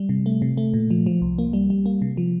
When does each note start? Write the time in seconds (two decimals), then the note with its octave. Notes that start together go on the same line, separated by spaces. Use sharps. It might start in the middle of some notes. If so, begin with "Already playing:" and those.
Already playing: G3
0.09 C3
0.26 A3
0.42 C3
0.57 A3
0.74 A#2
0.90 F3
1.06 F3
1.22 C2
1.38 A#3
1.53 G3
1.70 G3
1.86 A#3
2.02 C3
2.17 F3